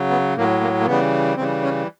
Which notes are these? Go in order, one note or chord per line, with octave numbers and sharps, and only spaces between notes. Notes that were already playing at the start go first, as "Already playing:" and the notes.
Already playing: C#3 F#3
B3
A2 F#3 A#3
A#3
A#3
C#3 E3 G3 B3
C#3 E3 G3 C4
C#4